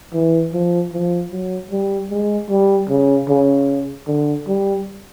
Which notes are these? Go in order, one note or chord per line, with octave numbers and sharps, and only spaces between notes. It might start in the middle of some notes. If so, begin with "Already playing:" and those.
E3
F3
F3
F#3
G3
G#3
G3
C#3
C#3
D3
G3